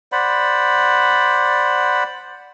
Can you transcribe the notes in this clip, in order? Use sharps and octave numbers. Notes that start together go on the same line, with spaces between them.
C5 D5 F#5 B5